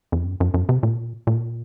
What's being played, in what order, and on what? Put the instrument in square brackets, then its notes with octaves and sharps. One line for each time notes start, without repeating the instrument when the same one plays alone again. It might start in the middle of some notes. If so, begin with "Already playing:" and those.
[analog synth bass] F2
F#2
F#2
F#2
C3
A#2
A#2